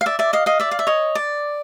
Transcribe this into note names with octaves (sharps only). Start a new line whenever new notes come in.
F5
D5 E5
D5 E5
D#5 F5
D#5 F5
D5 E5
F5
E5
C#5 D#5
D5